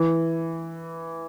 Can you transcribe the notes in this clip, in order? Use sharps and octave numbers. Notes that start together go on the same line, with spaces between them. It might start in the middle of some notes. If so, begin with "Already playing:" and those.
Already playing: E3